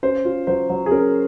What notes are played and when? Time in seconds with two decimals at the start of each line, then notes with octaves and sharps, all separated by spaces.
0.03 C#4 C5
0.25 F4
0.47 F#3 C5
0.69 F#3
0.86 G#4
0.91 C#4 A#4